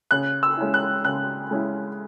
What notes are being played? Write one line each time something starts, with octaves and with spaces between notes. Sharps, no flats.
C#3 F#6
E6
G#3 C#4 E4
F#6
C#3 F#6
G#3 C#4 E4